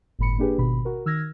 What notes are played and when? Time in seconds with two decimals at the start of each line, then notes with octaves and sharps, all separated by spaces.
0.19 G1 A2 B5 C#7
0.38 A#3 D4 G4 G#4 B4
0.58 G#1 B2 B5
0.85 F#4 A#4
1.06 D#3 E6 F6 G#6 A#6